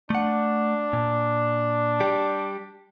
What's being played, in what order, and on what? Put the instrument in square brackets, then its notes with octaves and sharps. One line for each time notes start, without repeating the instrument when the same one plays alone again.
[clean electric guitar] A3 F#5 [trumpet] D4
[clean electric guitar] A#2
G3 G4